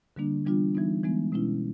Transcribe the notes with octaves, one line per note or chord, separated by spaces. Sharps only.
D3 G3 A#3 D4
E3 G3 B3 D4 F4
E3 G3 B3 D#4
E3 G#3 B3
B2 G#3 C#4 E4